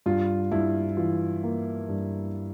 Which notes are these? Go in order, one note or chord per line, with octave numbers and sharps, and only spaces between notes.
G2 F4
G2 E4
E3 F4
A#3
G2